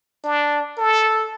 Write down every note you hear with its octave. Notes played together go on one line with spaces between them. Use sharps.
D4
A4